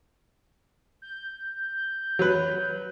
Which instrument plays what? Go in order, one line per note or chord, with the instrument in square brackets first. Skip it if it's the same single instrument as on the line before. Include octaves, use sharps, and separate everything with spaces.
[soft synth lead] G6
[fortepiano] F#3 B4